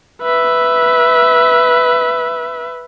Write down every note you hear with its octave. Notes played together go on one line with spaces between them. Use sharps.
B4 E5